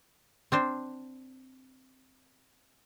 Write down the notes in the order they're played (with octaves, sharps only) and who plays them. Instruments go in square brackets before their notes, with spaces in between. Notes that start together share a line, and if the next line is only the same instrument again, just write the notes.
[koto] C4 D4 C5